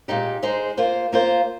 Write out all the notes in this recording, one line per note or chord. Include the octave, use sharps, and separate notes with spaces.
A#2 G#3 D#4 G4
G#3 D#4 G#4 C5
A#3 F4 C5
A#3 F4 C5